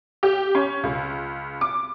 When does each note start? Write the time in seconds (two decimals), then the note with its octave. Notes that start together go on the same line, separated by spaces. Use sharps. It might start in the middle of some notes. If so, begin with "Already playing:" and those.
0.23 G4
0.55 C#4
0.83 C#2
1.61 D6